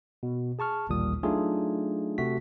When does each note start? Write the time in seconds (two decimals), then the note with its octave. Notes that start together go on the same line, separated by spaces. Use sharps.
0.23 B2
0.59 G#4 A5 C#6 F6
0.89 A1 D#2 A#2 G3 D#6
1.23 F#3 A3 D4 D#4 F4 G#4
2.18 C3 A3 F#4 B6